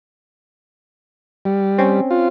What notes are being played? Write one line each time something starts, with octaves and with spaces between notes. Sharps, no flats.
G3
C4 C#4
F4